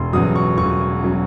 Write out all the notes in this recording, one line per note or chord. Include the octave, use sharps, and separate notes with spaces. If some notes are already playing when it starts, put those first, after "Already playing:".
Already playing: E1 C6
E2 C#3 F#3 D#6
C#6
E1 C#6
C#3 F#3